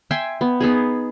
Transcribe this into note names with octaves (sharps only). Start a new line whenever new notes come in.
E5 G5 G#5 C6
B3
B3 D#4 G#4